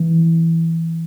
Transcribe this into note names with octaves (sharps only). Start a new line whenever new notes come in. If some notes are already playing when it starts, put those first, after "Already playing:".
Already playing: E3